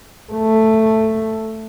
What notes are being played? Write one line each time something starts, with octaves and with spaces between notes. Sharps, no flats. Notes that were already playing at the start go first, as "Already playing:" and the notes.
A3